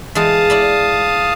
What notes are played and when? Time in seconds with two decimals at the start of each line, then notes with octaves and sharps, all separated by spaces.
0.15 E3 G#3 G#4 F5 A5 D#6
0.50 E4 D5 B5